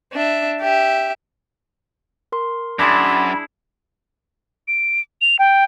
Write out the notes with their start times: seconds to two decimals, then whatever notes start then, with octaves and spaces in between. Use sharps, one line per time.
0.13 D4 E5
0.62 G4 E5
2.32 A#4 C6
2.79 F#2 D4 E4 G#4 B5 C6 D6 A#6
4.68 D7
5.21 F7
5.39 G5